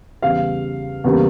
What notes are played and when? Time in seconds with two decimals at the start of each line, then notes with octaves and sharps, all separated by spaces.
0.22 E2 C#3 G3 F5
1.04 E2 C#3 G3 A#3